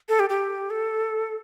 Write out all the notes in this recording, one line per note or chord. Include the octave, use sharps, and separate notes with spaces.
A4
G4
G4
A4